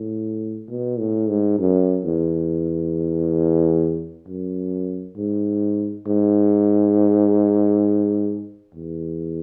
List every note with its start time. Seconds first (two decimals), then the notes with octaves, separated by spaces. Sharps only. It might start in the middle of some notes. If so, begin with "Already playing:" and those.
Already playing: A2
0.70 B2
0.99 A2
1.29 G#2
1.59 F#2
2.04 E2
4.28 F#2
5.17 G#2
6.07 G#2
8.75 E2